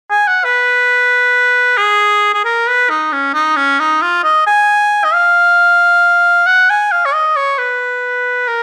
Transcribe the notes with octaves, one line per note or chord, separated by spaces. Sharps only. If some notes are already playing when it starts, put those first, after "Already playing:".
G#5
F#5
B4
G#4
G#4
A#4
B4
D#4
C#4
D#4
C#4
D#4
F4
D#5
G#5
D#5
F5
F#5
G#5
F5
C#5
D#5
C#5
B4
A#4